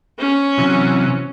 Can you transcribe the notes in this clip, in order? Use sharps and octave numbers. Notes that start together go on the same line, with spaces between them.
C#4
C3 E3 F#3